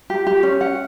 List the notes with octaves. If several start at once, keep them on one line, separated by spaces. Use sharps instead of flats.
G4
G4
C#4
F#5